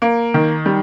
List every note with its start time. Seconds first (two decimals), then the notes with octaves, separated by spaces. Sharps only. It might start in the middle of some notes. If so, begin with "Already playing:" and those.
0.02 A#3
0.34 D#3
0.66 G3